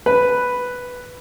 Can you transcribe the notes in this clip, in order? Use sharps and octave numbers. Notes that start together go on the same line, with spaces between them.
B4